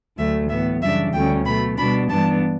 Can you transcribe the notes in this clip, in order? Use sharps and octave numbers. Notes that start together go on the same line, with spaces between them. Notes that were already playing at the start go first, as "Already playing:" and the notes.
D2 D3 F#3 A3 E5
A2 E3 B3 E5
F#2 C#3 E3 G3 D4 E5
D2 D3 G3 C#4 G5
B2 F#3 A3 B5
B2 G3 D4 B5
G2 E3 B3 D4 A5